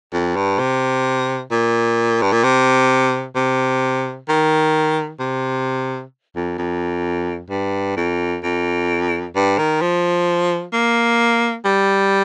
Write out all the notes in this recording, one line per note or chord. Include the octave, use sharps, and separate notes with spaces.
F2
G2
C3
A#2
G2
A#2
C3
C3
D#3
C3
F2
F2
G2
F2
F2
G2
D#3
F3
A#3
G3